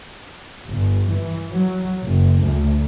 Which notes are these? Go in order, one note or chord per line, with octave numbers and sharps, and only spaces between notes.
G1
E3
F#3
F#1
D2